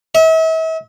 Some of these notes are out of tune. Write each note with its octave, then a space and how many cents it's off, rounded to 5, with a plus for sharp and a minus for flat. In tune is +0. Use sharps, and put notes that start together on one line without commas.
E5 -40